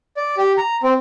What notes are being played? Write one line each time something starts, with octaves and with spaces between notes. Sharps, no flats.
D5
G4
A#5
C4